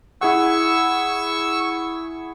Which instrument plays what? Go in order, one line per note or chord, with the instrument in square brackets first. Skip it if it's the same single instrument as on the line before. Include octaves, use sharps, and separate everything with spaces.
[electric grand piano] E4 G#4 F#5 [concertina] C#6 E6